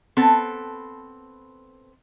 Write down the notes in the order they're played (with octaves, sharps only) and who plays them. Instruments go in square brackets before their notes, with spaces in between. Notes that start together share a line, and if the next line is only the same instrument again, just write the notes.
[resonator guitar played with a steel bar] B3 C4 A4